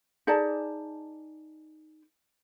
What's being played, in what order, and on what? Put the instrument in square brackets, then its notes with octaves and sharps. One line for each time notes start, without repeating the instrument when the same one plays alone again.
[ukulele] D#4 G#4 D5 A5